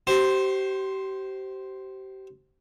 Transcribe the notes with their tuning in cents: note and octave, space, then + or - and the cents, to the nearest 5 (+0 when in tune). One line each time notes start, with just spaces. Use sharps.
G4 -30 C5 +0 C6 +40